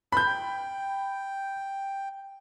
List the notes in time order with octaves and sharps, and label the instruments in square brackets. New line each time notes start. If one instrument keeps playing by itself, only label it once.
[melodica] B4 A5 C6 [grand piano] B5 G6
[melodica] G5